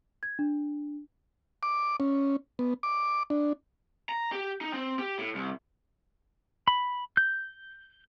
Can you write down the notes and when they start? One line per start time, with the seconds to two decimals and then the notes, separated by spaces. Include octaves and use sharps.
0.23 G#6
0.39 D4
1.63 D6
2.00 C#4
2.59 B3
2.83 D6
3.30 D4
4.09 A#5
4.32 G4
4.61 D#4
4.73 C4
4.99 G4
5.18 A2
5.35 C2
6.68 B5
7.17 G6